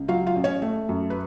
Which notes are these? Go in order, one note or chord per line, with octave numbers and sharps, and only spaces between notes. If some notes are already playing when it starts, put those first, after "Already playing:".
Already playing: C#2
F#3 F4 F5
F4 F5
A1
C#4 C#5
A3
F#2
B4